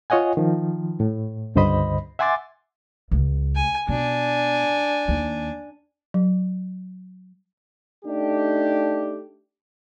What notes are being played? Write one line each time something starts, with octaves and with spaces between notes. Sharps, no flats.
F4 C#5 D#5 F#5 G#5
D#3 F3
A2
C#2 G2 D3 C5 D#5 B5
E5 F#5 G#5 C6 D6 A6
C#2
G#5
B2 D4 G#5
D#2
F#3
A3 D4 D#4 G4